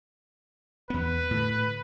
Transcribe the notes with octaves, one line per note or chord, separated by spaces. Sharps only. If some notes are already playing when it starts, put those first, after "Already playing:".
E2 B3 B4
A2 D3